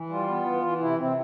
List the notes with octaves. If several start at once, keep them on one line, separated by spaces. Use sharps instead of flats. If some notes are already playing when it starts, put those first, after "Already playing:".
Already playing: E3
G3 F4
B3
E3
E3
C3 E4
C3 C4